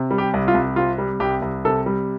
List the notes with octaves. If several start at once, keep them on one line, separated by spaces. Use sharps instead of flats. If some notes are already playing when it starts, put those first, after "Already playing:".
Already playing: C3
G3
G4
C2
F4
C2
C3 F4
G3
C2 G4
C2
C3 A4
G3